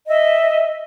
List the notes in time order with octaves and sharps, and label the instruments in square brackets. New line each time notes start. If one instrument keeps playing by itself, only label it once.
[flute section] D#5 E5